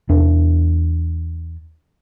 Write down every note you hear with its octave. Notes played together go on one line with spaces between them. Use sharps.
E2 D4